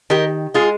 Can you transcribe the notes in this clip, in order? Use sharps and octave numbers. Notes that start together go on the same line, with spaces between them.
D#3 G4 A#4
G#3 F4 G#4